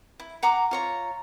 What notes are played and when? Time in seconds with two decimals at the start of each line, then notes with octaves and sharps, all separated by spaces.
0.20 E4
0.43 F#5 A#5 C#6 D6
0.71 F4 C#5 A#5